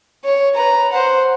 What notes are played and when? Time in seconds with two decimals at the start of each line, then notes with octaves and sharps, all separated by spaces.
0.25 C#5
0.55 B4 A#5
0.93 C5 F#5